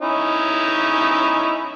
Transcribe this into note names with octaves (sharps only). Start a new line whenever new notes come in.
C#4 D#4 E4